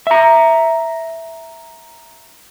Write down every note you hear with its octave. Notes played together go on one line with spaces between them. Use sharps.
E5 A#5